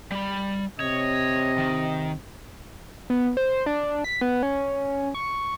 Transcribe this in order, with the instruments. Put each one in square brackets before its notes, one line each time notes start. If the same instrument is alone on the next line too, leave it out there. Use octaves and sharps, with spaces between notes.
[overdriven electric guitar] G3 B5
[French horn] C3 [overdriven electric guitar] C#5 [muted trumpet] D#5
[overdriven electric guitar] D#3
[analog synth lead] B3
C5
D4
B6
B3
C#4
C#6